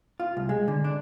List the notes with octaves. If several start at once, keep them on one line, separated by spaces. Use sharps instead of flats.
F4
C2
G#3
D3
D4